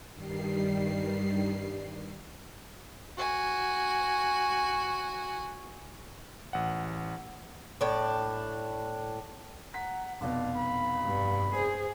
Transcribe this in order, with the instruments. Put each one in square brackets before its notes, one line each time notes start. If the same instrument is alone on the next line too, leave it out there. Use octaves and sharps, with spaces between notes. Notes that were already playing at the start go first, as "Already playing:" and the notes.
[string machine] G2 D#3 G3 C7
[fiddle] F#4 G#5
[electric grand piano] A1 F#5
[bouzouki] A2 D4
[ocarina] F#5 [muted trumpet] A#5 [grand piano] B6
[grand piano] F1 B2 [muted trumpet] D4 [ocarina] F5
[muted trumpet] B5
[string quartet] G2
[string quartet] G#4 [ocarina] C5